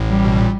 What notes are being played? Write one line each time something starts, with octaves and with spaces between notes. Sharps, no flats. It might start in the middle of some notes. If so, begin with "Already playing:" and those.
Already playing: A1 A2
G3
B2
A#2